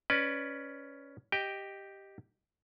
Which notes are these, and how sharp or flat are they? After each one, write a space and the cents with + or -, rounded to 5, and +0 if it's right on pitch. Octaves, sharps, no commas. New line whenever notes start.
C#4 +10 B4 +0 D5 +25
G4 +0 D#5 +0 G5 +0